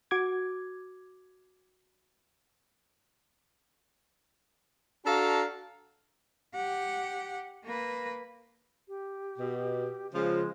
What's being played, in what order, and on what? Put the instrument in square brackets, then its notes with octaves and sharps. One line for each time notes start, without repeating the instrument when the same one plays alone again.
[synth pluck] F#4 D6 G#6
[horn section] D4 F#4 A4 F5 A#5
[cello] G4 F#5
A#3 B4
[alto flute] G4
[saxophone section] B2
[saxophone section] C#3 F3 [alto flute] G#3